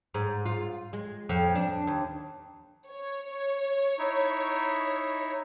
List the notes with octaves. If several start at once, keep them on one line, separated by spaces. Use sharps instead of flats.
G#2
F4
G#3
F2
D4
D#2
C#5
D#4 E4